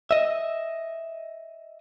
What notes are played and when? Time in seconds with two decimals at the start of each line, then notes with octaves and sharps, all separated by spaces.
0.11 D#5 E5